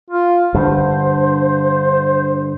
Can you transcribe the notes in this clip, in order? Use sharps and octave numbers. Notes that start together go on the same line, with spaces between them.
F4
G2 D3 C5